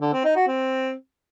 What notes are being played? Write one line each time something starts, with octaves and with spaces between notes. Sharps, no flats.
D3
C4
D#4
F#4
C4